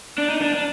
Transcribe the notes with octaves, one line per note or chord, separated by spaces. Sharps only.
D4
D#4
D4
D4